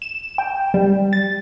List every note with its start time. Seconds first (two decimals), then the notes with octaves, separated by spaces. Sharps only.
0.02 E7
0.38 G5
0.74 G3
1.13 A6